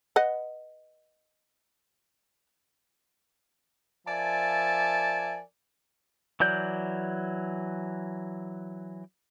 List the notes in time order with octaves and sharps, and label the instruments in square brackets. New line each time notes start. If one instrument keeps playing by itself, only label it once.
[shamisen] B4 D#5 F#5
[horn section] F3 A#4 D5 E5 G#5 A5
[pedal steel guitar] E3 F#3 D5 G6